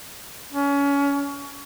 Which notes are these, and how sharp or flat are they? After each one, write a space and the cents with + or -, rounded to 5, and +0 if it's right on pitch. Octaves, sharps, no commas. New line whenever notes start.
C#4 +30